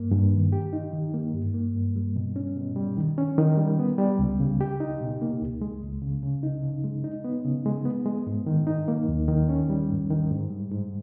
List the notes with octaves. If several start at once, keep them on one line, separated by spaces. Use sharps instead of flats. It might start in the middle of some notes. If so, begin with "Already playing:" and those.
Already playing: G2 A#3
G2
D#3
G4
D#4
D#3
A#3
G2
A#3
G2
G3
B2
C#4
B2
G3
D#3
C#4
D#3
G3
B3
G3
C#2
C#3
G4
D#4
B2
A#3
C#2
G#3
C#2
C#3
C#3
D#4
C#3
G#3
D#4
B3
C#3
G#3
B3
G#3
G#2
D#3
D#4
A#3
D#2
D#3
C#4
G3
G#2
D#3
G#2
G3
G#2